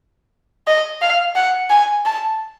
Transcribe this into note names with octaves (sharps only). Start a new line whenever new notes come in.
D#5
F5
F#5
G#5
A5